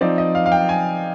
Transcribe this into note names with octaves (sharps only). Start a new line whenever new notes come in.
F3 C4 D#4 D5
D#5
F5
F5
G5
G#5